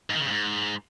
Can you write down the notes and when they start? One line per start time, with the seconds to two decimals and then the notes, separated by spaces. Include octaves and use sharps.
0.10 G#2
0.15 D#3
0.20 C#3
0.25 G2
0.31 G#2